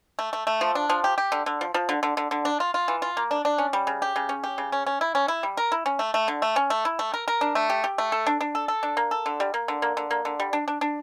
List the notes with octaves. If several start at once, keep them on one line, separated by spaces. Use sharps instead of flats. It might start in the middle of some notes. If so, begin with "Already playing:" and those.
A3
A3
A3
F3
D4
F3
G4
G4
D3
D3
F3
F3
D3
D3
D3
D3
D4
F4
F4
E3
F4
A#3
D4
D4
C#4
G3
C#3
G4
C#3
C#4
G4
C#3
C#4
C#4
E4
C#4
E4
G3
A#4
E4
C#4
A3
A3
D3
A3
C#4
A3
E4
A3
A#4
A#4
D4
A3
G4
G4
A3
A4
D4
D4
A4
A4
D4
A#3
A4
D3
G3
A#3
D3
A#3
D3
A#3
D3
G3
D4
D4
D4